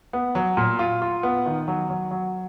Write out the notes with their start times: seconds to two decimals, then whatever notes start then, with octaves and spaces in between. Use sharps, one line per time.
0.13 B3
0.35 F#3
0.57 A#2
0.79 F4
1.02 F4
1.23 B3
1.46 D#3
1.68 F#3
1.90 F#3
2.11 F#3